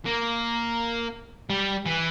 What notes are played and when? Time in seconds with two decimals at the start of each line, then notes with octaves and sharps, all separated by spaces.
0.05 A#3
1.50 G3
1.86 E3